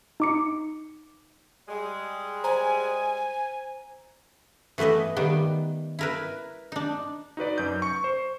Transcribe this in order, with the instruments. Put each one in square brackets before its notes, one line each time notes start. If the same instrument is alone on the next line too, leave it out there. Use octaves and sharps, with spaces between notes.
[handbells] D#4 D6 C#7
[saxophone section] G3 G#3
[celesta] C5 A#5 [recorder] G#5
[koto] E3 A3 B3 B4 D#5
D#3 G3 B3
E4 A#4 B4
D4 D#4
[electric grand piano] D#4 F#4 B4 D5
F#2 G6
C#6 C#7
C5